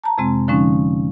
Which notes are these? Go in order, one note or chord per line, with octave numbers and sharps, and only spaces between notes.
A5 A#5
F2 C3 G#3 C4
D3 F3 G#3 C#4 D#4